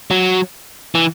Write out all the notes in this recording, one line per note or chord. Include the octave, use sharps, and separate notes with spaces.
F#3
E3